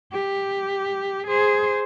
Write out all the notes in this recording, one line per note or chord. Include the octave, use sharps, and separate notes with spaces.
G4
G#4 C5